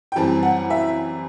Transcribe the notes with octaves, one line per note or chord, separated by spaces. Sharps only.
G5
F#2 E3 G3 C4 A5
F#5
E5